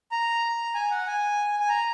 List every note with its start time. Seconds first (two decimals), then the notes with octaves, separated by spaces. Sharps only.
0.12 A#5
0.74 G#5
0.91 F#5
1.06 G#5
1.60 G#5
1.69 A#5